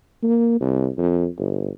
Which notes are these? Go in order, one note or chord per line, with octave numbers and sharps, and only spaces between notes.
A#3
C2
F2
G1